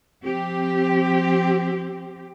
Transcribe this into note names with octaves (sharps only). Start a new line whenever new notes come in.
F3 C4 G4